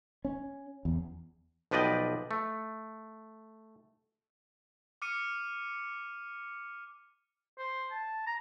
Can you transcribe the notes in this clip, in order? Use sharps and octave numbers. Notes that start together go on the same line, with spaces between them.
C#4
E2
B1 F3 B4 D5 D#5 G5
A3
D6 F6 C#7 D#7
C5
A5
A#5